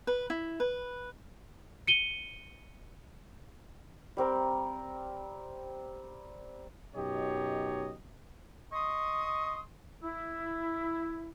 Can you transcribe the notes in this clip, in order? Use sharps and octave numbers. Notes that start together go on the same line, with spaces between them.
B4
E4
B4
C#7 D#7 G7
G3 C4 A#4
F#2 B2 D#4 G4 C#5 D#5
D#5 C6 C#6 D#6
E4